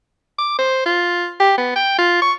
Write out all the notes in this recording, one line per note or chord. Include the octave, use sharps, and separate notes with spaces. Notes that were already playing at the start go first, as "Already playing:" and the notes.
D6
C5
F4
G4
B3
G5
F4
C#6